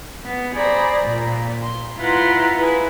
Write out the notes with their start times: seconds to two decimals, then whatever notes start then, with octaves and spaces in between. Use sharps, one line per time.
0.24 B3
0.57 G#4 C5 D5 A#5 B5
1.04 A#2
1.64 C6
1.99 E4 F4 B4 F#5 A#5 C6
2.58 E4 G#4 B4